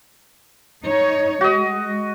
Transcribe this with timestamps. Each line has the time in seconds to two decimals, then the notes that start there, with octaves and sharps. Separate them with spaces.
0.86 D#4 C#5
1.41 G#3 F#4 D#5